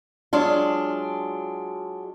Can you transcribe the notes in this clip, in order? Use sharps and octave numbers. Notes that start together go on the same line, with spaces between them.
F#3 G#3 D4 F4